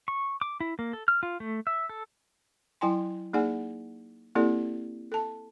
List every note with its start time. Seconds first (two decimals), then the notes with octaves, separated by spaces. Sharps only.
0.08 C#6
0.41 D6
0.60 E4
0.79 A#3
0.93 A4
1.08 F6
1.23 F4
1.40 A3
1.67 E5
1.89 A4
2.81 F#3 E4 G5 G#5 C6
3.33 A#3 D#4 G#4 D5 F#5 G#5
4.35 A#3 C4 E4 G4 A4 D5
5.12 A4 A5